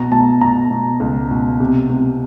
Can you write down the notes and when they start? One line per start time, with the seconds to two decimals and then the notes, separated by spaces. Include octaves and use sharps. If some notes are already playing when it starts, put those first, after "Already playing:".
Already playing: B2 A#5
0.12 B2 A5
0.41 B2 A#5
0.71 B2
1.00 C#2
1.31 B2
1.60 C3
1.90 C3